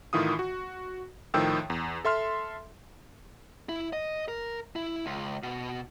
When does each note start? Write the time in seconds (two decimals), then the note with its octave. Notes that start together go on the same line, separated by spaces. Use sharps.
0.13 A2 D#3 E3 F4 D#6
0.39 F#4
1.34 A2 D#3 F3 G5 E6
1.70 E2
2.05 A4 E5 C6 F6
3.69 E4
3.93 D#5
4.28 A#4
4.76 E4
5.06 C#2
5.43 B2